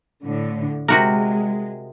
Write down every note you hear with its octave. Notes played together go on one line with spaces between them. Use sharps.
A2 D3
C3 G#3 F#4 A#4